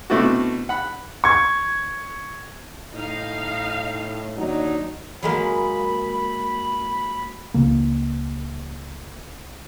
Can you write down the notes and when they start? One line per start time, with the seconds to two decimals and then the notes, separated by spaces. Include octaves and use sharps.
0.10 B2 A3 C4 D4 E4 F#4
0.69 F#5 B5
1.24 C#6 G#6
2.94 A2 D#4 F5
4.37 D#2 F#3 D4 D#4
5.23 F#3 G#3 A#3 B5
7.54 C#2 C#3 A#3